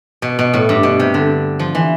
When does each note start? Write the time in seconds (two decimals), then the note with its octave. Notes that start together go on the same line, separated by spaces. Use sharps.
0.22 B2
0.39 B2
0.53 A2
0.69 G2
0.83 B2
1.00 C3
1.14 D3
1.59 F3
1.75 E3